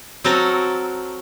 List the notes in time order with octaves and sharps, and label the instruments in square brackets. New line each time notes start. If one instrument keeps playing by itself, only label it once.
[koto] F#3 C4 F#4 A4 A#4